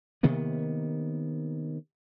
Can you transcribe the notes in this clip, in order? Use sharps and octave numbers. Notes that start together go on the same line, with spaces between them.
C3 D#3 A#3 B3